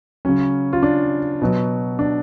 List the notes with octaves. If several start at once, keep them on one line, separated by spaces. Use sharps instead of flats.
C#3 F#3 C#4
F4
D4
B2 F#3
D4